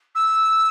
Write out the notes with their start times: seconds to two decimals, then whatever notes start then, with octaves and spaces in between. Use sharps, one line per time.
0.15 E6